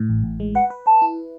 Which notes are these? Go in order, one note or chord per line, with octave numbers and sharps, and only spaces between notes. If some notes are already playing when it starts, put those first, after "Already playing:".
Already playing: A2
A1
A1
G#3
B4 F#5
B4
B4 A5
E4